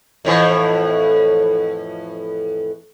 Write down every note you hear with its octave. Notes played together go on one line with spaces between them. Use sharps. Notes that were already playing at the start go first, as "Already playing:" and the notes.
F2 A2 E3